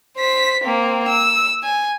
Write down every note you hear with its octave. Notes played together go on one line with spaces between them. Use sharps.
C5 B6
A#3 C4
E6
G#5